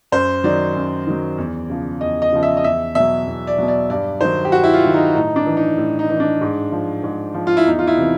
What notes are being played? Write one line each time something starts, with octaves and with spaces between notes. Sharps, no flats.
F#2 C5
D#3 F#3 D5
F#2
D#3 F#3
E2
C#3 F3
E2 D#5
D#5
C#3 F3
E5
D#5
E2 E5
B2 F#3 E5
E2
D5
B2 F#3
D5
G2 D5
D#3 F#3 C5
G4
G2 F#4
E4
F4
D#3 F#3
D#4
A2 D#4
D4
E3
D#4
A2
D#4
E3 D#4
D4
G#2
F3
G#2
F3
F4
E4
E2 D#4
F4
E4
C3 E3